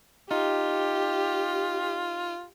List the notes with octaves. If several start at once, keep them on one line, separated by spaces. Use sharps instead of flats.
D#4 F4 G4